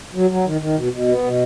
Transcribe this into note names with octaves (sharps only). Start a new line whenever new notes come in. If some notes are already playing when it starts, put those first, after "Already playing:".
F#3
F#3
D#3
D#3
B2
B2
B3
B2